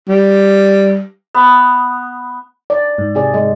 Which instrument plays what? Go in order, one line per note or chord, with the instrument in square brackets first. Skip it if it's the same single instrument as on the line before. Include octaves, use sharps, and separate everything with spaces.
[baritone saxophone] G3
[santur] B3
[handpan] D5
[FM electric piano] G#2
[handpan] C3 G#4 D5
G#3